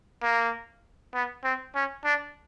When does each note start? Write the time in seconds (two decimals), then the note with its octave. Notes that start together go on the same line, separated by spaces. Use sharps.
0.23 A#3
1.14 B3
1.44 C4
1.75 C#4
2.05 D4